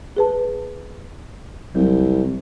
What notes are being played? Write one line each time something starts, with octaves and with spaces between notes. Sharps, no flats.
G#4 B4 A5
C2 F#3